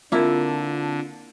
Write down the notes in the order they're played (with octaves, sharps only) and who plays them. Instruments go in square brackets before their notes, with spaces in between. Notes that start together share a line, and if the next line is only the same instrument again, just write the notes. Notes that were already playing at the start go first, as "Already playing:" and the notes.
[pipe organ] D3 [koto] A#3 E4 [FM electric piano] C4 F4 A5